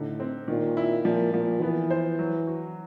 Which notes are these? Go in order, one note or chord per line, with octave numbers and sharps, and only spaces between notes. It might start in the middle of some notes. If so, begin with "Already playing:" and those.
Already playing: A2 D3 D#4
C4
A#2 D#3
E4
A#2 F3
A#2 F3
E3 B3
C5
F#3
F#4